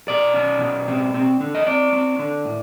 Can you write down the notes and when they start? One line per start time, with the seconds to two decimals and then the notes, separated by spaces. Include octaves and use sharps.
0.08 B2 D5
0.34 C#4
0.61 B2
0.88 C4
1.14 C4
1.41 D3
1.55 D#5
1.67 C4 D5
1.93 C4
2.19 D3
2.45 A2